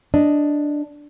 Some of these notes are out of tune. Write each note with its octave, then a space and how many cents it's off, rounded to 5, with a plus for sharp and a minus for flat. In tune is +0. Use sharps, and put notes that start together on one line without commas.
D4 +0 D#5 +0